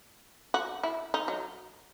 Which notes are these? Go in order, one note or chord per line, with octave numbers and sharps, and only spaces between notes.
F#4
E4
D#4
F#3